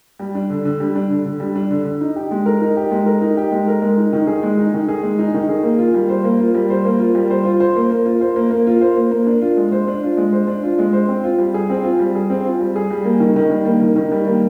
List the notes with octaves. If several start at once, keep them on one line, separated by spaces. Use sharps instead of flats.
G3
D4
D3
D3
G3
D4
D3
D3
G3
D4
D3
D3
D#4
G4
G#3
A#4
D#4
G4
G#3
A#4
D#4
G4
G#3
A#4
G#3
D#4
D#3
G#4
G#3
D#4
D#3
G#4
G#3
D#4
D#3
G#4
A#3
F4
G3
C5
A#3
F4
G3
C5
A#3
F4
G3
C5
F4
C5
A#3
A#3
F4
C5
A#3
A#3
F4
C5
A#3
A#3
D4
F4
G#3
C5
D4
F4
G#3
C5
D4
F4
G#3
C5
C4
F4
G3
G#4
C4
F4
G3
G#4
C4
F4
G3
G#4
G3
A#3
D#3
D#3
G3
A#3
D#3
D#3
G3
A#3